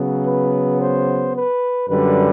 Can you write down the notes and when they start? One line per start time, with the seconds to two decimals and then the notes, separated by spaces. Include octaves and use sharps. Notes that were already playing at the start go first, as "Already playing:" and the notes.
Already playing: C#3 F#3 B3
0.25 B4
0.79 C5
1.35 B4
1.88 F#2 D3 G3 B4